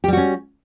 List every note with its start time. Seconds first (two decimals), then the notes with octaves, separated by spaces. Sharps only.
0.04 G4
0.08 G3
0.13 F#4
0.17 C#4